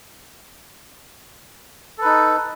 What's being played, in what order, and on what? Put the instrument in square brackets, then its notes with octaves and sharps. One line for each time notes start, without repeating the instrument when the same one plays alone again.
[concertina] A4
B4
D#4